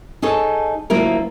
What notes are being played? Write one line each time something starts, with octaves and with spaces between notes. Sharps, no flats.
D#4 G#4 A4 C#5
D2 F#3 A#3 E4 F4 A#4